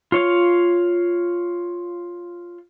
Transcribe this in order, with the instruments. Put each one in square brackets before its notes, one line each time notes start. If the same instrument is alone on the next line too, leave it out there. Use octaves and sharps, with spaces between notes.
[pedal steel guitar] F4 C#5 F5